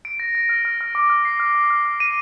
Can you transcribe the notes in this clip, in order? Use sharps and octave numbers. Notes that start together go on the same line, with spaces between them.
D7
A#6
A#6
F6
F6
F6
D6
F6
C7
F6
F6
F6
F6
D#7